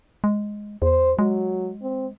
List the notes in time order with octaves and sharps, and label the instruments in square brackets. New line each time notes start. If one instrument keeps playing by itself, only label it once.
[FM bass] G#3
[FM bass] E2 [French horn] C5
[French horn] F#3 [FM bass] G#3
[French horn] C4